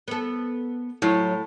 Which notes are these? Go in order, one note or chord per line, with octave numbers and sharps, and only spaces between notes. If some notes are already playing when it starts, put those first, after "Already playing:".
B3 A4
A2 F#3 F4